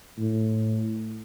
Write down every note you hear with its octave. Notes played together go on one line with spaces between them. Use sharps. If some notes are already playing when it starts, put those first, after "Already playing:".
A2